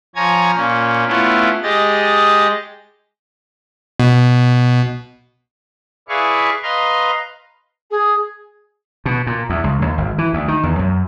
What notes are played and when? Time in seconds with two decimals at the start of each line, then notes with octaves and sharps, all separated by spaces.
0.16 F3 C#5 G#5 A#5 G#6
0.55 A#2 C#4
1.07 A3 B3 C#4 E4 F4
1.63 G#3 G4 D#5 A6
4.00 B2
6.09 E4 G#4 B4 D5 F5 C#6
6.63 B4 D#5 F5 A#5 C6
7.90 G#4
9.06 B2
9.27 A#2
9.50 E2
9.64 C#2
9.82 D#2
9.98 G#1
10.18 E3
10.33 D2
10.48 D#3
10.63 E2
10.79 F#2